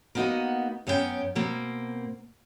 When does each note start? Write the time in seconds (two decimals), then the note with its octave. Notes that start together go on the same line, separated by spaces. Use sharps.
0.15 A#3 B3 D#4 F4 F#4 D#5
0.87 F#2 B3 C#4 F4 G5
1.35 B2 A#3 C4